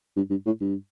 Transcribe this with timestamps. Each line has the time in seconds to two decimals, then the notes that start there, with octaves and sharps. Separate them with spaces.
0.16 G2
0.30 G2
0.46 A2
0.61 G2